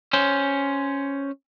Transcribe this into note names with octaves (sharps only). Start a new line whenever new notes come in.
C#4 C5